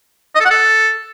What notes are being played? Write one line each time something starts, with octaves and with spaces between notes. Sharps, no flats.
D#5
A4
F#5
A4